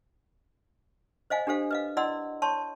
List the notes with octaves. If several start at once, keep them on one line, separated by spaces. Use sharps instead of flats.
C5 D#5 F5 G#5
D4 G4 A4 C5 F5
B4 D#5 F5
E4 D5 D#5 F#5 C6 E6
C#5 A5 C6 C#6